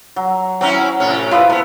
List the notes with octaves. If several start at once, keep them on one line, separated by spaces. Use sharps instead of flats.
F#3
F#3 C4 C#4 E4
A2 C3 C#4
E4 F4 B4 B5 D#6
A#2 B3 A4 A#4